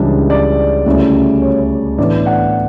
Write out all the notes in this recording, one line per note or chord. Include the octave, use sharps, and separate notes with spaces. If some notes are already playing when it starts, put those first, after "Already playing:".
Already playing: C#2 C#3 E3 G3 D4
D5
D2 C#3 G3 C#4 E4
C#5
A2 E3 B3 D4 D5
F#5